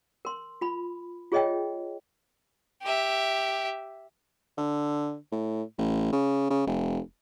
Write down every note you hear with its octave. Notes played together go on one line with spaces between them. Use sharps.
A#4 C6
F4 B5
F4 G#4 C#5 D#5 E5 G5
G4 E5
D3
A2
A1
C#3
C#3
F1